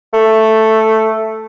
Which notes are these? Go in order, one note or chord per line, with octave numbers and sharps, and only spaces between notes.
A3